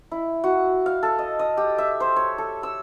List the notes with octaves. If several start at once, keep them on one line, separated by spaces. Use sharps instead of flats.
E4
F#4
F5
A4
D#5
D#5
G4
E5
C5
C#5
A4
E6